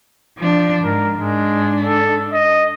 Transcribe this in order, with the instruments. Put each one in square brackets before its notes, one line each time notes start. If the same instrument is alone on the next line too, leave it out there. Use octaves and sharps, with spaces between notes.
[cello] F3 D4
[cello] G#2 [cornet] A#4
[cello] G#2 D4 [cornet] G#3
[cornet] A4
D#5